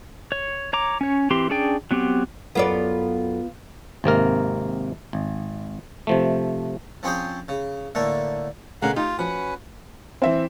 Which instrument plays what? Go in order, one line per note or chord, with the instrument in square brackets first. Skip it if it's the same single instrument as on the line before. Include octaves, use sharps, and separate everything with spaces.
[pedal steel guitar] C#5
C#5 A#5 D6
C#4 C#5
E3 C4 G4 C6
C#4 D4 G#4 D5 G5
F#3 B3 C4 G4
[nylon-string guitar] F#2 A4 F#5 [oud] B3 F4 D5
[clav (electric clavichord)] G#1 C3 A#3 A#4
G#1
C3 F3 A3
[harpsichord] F3 C4 C#4 G#4 C5
C#3
A2 D3 A3 A#3
[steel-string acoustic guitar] B2 A3 G#4 [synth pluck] D3 C#4 [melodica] A#4 F5 F#5
[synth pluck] D#4 [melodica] F4 [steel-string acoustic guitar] G4
[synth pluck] F3 [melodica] C#4 B4 [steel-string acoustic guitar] F#4 F#5
[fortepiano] E3 C4 [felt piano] C5 E5